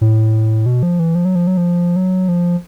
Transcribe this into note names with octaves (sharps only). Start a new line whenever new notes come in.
A2
B2
F3
E3
F3
F#3
F3
F#3
F3
F#3
F3